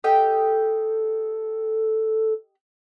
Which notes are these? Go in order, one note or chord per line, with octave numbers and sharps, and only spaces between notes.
G4 A4 D#5 G5